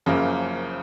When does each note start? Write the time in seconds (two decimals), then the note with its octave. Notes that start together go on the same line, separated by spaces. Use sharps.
0.06 F#1 F#2 C#3 F3 A#3